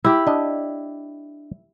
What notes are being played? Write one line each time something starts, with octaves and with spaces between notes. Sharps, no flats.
E4 G4
D4 D#5